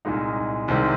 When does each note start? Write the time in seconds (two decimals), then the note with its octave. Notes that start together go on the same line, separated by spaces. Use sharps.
0.05 C2 A#2 G#3 D#4
0.68 C2 C3 D#3 G#3 C4